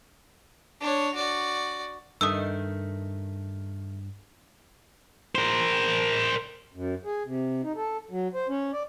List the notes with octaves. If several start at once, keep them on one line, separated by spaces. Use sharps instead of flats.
D4 C#5
F#4 D5
G2 D#3 A3 D#6 E6
A#4 C5
F#2
G#4
C3
D#4
A4
F#3
C5
C#4
D5